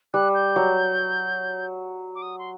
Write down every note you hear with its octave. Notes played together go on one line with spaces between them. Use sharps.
G3 F#6
G6
F#3
D6
D#6
C6